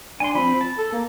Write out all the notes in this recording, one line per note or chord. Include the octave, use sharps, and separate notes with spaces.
D4 G#5 C6
F3 C4 B5
A5
A4
A#3